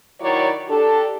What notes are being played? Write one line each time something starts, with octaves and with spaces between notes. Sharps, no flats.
D#3 F#3 E4 C#5 D5
D4 G4 A4